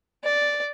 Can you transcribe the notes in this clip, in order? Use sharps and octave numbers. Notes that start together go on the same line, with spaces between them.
D5